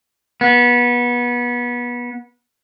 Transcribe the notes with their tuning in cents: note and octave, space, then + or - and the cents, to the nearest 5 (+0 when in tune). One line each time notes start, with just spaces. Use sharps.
B3 -25